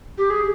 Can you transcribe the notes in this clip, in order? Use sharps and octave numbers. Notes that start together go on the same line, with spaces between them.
G4
G#4